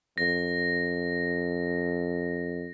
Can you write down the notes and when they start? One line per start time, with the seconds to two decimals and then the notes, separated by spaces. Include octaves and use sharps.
0.18 F2 A#6